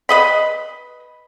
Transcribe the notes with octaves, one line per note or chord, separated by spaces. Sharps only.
B4 D#5 B5